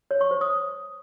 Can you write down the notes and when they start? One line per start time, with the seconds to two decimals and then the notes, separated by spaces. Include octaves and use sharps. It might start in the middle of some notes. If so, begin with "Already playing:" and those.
0.11 C#5
0.21 C#6
0.31 C5
0.41 D#6